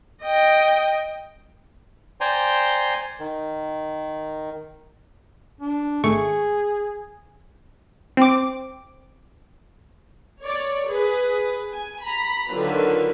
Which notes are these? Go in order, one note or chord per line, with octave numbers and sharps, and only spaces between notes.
D#5 G5
C5 D5 G5 G#5 A#5 C6
D#3
D4
G#1 A3 G#4 C#6
C4 D6
C#5 D5
G#4 B4
G#5
A#5 B5
D3 D#3 F#3 F4 B4